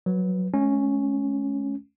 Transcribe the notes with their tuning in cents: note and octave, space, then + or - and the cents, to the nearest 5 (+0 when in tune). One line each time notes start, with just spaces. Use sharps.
F#3 -5 B4 +0
G#3 +45 C#4 +0